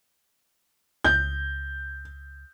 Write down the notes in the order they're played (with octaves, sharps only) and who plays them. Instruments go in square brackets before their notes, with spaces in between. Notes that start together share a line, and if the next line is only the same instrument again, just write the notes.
[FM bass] C#2 [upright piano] G6